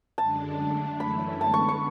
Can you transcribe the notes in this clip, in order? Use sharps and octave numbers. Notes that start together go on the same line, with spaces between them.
F#2 D3 G#3 D4 A5
D3 A3 D4
F#2 E3 A3 C#4 E4 B5
D3 G#3 B3 A5
C#6
C#6